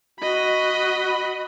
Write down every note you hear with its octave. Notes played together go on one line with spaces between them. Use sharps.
F#4 D#5 B5